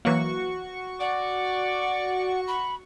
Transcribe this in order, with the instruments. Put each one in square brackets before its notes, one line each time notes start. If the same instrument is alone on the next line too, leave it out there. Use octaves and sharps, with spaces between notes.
[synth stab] E3 F#3 A#3 [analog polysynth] F#4 C#6
[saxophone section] D5 [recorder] F#5
[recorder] B5